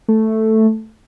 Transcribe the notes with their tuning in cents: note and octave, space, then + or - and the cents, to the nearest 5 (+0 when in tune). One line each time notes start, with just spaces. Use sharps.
A3 +0